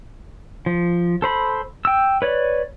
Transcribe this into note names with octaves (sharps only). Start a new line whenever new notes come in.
F3
A4 C5 B5
G5 E6
B4 C#5 D5